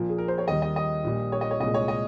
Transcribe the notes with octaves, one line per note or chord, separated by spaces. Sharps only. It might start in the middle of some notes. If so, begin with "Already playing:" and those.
Already playing: A#1 A#2 F3 A#3
G#4
A#4
C5
C#5
D#2 D#3 G3 D#5
D#5
D#5
A#1 A#2 G3
C#5
D#5
C#5
C2 A#2 G#3 D#5
C#5
D#5